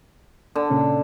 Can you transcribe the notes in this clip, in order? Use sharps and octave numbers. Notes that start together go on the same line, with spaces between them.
D3
A#2 C#3 C#4